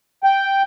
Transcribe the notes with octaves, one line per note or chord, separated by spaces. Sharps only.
G5